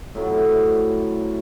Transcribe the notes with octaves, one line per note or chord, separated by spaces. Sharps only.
A2 C3 F#3